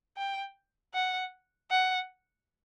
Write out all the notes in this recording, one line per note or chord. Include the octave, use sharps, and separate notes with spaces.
G5
F#5
F#5